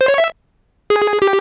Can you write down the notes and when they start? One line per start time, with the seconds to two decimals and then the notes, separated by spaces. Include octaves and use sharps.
0.01 C5
0.08 C#5
0.18 E5
0.90 G#4
1.22 G4